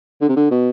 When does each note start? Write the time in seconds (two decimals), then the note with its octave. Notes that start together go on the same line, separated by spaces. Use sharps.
0.21 D3
0.29 C3
0.37 D3
0.51 B2